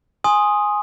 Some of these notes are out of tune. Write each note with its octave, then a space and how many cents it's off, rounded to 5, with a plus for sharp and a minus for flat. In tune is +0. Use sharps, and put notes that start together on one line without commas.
G#5 +0 C6 +15 D#6 +0